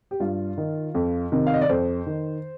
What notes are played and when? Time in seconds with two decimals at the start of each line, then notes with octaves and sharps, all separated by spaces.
0.11 G4
0.20 G2 F4
0.57 D#3
0.95 F2
1.32 C3 D#3
1.46 F5
1.54 D#5
1.61 D5
1.69 F2 C5
2.06 D#3